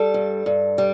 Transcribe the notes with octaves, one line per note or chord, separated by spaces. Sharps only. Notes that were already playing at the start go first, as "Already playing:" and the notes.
Already playing: G3 A4
G2
G2
G3